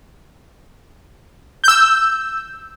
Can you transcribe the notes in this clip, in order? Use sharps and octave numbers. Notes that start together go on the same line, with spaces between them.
E6 G6